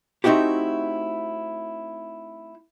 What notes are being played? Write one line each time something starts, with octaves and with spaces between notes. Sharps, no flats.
A3 C4 D#4 E4 F#4 G4